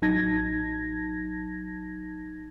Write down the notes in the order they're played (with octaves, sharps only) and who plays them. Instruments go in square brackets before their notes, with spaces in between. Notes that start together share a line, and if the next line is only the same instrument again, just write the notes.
[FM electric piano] A1 F#3 D#4 A5 G#6 A#6